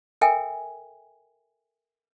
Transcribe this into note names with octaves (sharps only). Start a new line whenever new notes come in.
A4 A#4 E5 G5 G#5